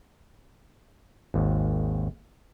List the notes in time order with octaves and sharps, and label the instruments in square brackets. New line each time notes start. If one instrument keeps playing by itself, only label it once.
[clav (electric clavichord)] G#1 D#2